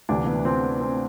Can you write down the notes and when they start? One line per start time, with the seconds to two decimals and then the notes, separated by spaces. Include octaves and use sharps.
0.09 D2 C3 E3 D4
0.26 B3
0.45 C4
0.80 C4